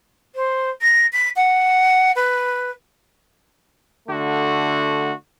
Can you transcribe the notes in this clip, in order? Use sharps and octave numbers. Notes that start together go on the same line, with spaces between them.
C5
A#6
B6
F#5
B4
D3 A3 F#4